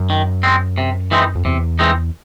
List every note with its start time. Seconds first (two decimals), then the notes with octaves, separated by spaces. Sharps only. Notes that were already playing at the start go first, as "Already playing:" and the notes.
Already playing: F#2
0.10 D#3
0.43 G#3 C4
0.78 C3
1.11 E3 G#3 C4 D#4
1.35 F2
1.45 E2 C3
1.79 E3 G#3 C4 D#4